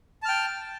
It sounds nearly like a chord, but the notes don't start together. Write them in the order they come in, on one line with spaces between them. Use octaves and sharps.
A5 F6 G5